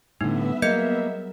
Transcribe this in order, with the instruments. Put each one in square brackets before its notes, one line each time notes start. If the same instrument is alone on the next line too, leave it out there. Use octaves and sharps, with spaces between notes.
[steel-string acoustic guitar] A2 D3 [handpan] G3 [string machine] B3 E5 [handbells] D#4
[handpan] F#3 G#4 A#4 [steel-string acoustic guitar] A#3 [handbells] D#5 G6 C#7